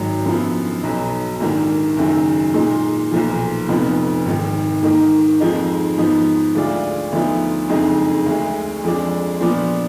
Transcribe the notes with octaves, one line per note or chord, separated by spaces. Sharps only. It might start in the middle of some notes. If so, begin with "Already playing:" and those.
Already playing: G#1 G#2 F#3
F#2 D3 F3 B3
B1 B2 F#3
A#1 G#2 D#3 A#3
F#1 F#2 D#3
A#2 G#3 D#4
B1 A#2 F3
F1 F2 F3 B3 D#4
G#1 G#2 D#3
G#2 D#3 A#3 D#4
F2 F3 G#3 D#4
G#2 F3 B3 D#4
D2 D3 G#3 D4 F4
D2 D3 F3 B3 D#4
F#1 F2 D3 G#3 D#4
D2 D3 G#3
F2 F3 G#3 D4
A#2 F3 B3 D4